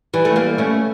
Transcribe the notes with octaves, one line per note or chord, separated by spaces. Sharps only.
E3 G3
A3
G3 A#3
A3 C#4